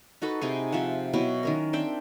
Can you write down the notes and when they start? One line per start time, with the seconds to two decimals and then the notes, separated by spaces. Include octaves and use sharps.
0.22 D#4 F#4 A4 B4
0.41 C3 D#4 G#4
0.72 C3 F3 E5 F#5
1.13 B2 F#3 B3 E4
1.43 D#3 C#4 A#4
1.73 C4 D4 E5 G5